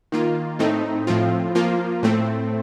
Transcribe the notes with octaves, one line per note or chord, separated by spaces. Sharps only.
D#3 A#3 F4
A2 A3 C4 D#4
A2 F3 C4 F4
F3 A#3 F4
A2 A3 C4